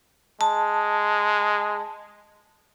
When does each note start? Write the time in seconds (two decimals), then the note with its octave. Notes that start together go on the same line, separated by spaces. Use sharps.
0.41 G#3 A5